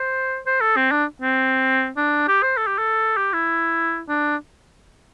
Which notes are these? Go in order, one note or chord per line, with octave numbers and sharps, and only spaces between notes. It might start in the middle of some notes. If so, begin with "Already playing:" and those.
Already playing: C5
C5
A4
C4
D4
C4
D4
G4
C5
A4
G4
A4
G4
E4
D4